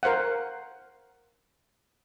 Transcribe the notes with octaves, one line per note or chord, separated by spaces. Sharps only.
A#4 C5 F5 F#5